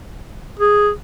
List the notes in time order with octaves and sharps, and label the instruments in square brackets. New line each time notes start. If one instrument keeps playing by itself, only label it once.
[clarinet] G#4